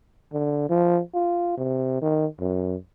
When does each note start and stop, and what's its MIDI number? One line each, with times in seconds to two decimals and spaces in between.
0.33 0.66 50
0.69 1.00 53
1.14 1.53 65
1.57 2.01 48
2.02 2.26 51
2.40 2.75 42